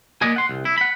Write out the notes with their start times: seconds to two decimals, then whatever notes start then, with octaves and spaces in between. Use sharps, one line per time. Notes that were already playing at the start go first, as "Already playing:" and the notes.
0.22 A#3 B3 D5 D#5 G#5
0.36 F#5 C6
0.49 C2
0.65 E4
0.78 F#5 B5